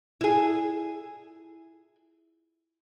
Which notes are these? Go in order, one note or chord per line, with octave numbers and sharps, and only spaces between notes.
E4 G#4